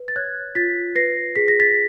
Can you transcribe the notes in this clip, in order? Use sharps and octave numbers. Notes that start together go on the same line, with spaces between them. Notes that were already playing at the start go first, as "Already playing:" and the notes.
Already playing: B4
A6
C#5 F#6 G#6
F4 A6 B6
B4 A#6 C7
G#4 B6
A#6
A6 B6